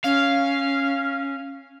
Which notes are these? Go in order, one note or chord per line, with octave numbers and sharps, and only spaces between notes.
C#4 F5